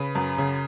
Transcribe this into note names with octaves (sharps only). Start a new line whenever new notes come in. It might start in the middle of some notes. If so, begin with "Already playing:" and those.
Already playing: C#3 B4
F#2
C#3